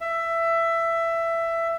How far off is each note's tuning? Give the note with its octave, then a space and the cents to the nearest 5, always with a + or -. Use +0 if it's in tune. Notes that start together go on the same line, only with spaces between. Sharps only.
E5 +15